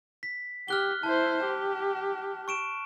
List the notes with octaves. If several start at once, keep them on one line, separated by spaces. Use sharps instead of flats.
B6
G4 F6 F#6 G7
E4 C5 A5
G4
C#6 D7 E7